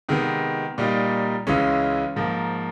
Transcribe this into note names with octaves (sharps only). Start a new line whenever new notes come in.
C3 D#3 G#3 B3
A#2 G3 A#3 D#4
C#2 C#3 E3 G#3 C#4
G#2 F3 A#3